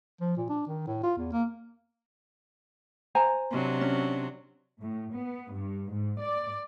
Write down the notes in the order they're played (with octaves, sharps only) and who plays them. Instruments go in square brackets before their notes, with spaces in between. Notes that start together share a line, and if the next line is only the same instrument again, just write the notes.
[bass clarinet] F3
A#2
D4
D#3
A2
F4
E2
A#3
[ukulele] C5 G#5 A#5
[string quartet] C3 F#3 D4
[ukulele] C#4
[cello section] A2
B3
G2
G#2
D5